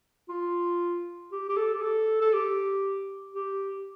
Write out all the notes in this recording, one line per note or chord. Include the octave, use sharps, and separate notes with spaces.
F4
G4
G4
A4
G4
A4
A4
G4
G4